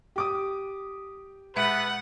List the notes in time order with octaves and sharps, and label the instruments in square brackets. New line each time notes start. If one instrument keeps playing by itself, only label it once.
[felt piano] G4 D6 D#6
[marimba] A#2 G#3 E5 [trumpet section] A3 B3 B4 [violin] F#5